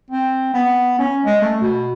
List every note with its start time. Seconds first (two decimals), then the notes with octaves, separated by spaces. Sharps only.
0.10 C4
0.54 B3
0.99 C#4
1.25 G#3
1.41 A3
1.61 B2